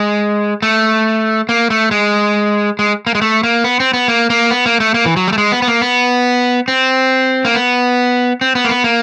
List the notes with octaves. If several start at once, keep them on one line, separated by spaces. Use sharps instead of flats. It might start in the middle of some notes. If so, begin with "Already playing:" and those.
Already playing: G#3
A3
A#3
A3
G#3
G#3
A#3
G#3
A3
A#3
B3
C4
B3
A#3
A#3
B3
A#3
A3
A#3
E3
F#3
G3
A3
G#3
B3
B3
A#3
B3
C4
A#3
B3
C4
B3
A#3
B3
A#3